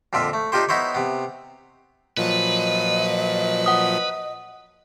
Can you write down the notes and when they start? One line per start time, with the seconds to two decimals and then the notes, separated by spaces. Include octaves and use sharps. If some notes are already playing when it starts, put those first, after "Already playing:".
0.13 F2 A#2 D3 F4 E5
0.33 A3
0.52 D4 D#4 F4 G4 C5
0.69 B3 D#4 E4 C5 C#5
0.94 C3 B3
2.17 A#2 F3 F#3 B4 D#5
3.66 F#5 D#6